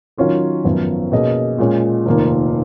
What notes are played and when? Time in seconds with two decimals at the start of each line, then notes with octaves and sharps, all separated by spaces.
0.17 D#3 F#3 C#4 F4 A#4
0.64 G#1 F#2 F3 B3
1.12 B2 A#3 C#4 G#4 D#5
1.58 A#2 G#3 C#4
2.06 F1 D#2 D#3 A#3 F4